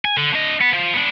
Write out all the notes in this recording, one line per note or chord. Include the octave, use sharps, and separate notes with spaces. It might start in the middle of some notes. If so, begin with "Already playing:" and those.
G#5
D3
D4 D#5
B3
F3
B3 D4